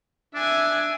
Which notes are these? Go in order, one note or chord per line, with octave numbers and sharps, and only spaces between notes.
D4 E5 G#5